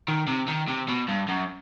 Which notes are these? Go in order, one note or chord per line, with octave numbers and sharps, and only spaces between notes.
D#3
C3
D#3
C3
B2
G2
F#2